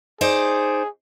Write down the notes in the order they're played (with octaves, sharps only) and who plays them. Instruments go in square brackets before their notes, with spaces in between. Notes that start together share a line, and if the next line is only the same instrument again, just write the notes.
[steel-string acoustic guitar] D#4 C5 D5 [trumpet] G#4